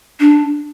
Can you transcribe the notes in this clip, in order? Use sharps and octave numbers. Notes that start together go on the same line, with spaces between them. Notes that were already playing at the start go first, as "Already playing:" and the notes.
D4